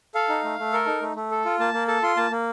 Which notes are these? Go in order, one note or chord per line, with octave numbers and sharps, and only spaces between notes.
A4 F5
D#4
A3
A3
A4 A#4
D#4
A3
A3
A4
F4
A#3 A5
A#3
A4 A5
F4 C6
A#3 A5
A#3